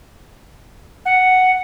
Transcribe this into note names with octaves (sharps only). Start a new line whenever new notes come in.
F#5